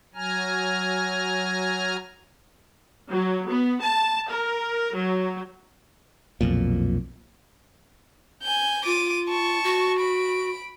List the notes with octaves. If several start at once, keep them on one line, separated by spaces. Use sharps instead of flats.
F#3 G#5 A#5 F6
F#3
B3
A5
A#4
F#3
B1 F2 A#2
G#5 G6
F4 D6 D#7
A5 C#6
F#4
B5 D7